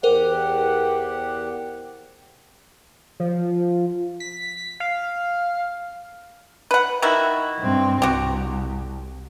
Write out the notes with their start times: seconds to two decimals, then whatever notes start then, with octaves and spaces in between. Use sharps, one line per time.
0.03 E2 G4 A#4 C5 F#5
3.20 F3
4.20 B6
4.80 F5
6.71 B4 F#5
7.02 D#3 E4 F#4
7.59 G2 C4
8.02 C2 F#4 G4